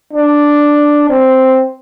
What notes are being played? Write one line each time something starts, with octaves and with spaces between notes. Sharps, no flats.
D4
C4